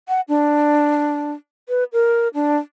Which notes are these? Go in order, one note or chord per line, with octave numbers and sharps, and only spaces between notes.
F#5
D4
B4
A#4
D4